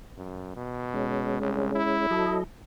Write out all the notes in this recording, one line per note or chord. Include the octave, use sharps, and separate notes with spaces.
F#2
B2
G#3 C#4
C2
E4
F#3 A4 D#5